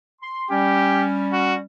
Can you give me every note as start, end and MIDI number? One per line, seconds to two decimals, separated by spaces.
0.22 0.45 84
0.51 1.62 55
0.51 1.62 61
0.51 1.05 67
1.33 1.55 66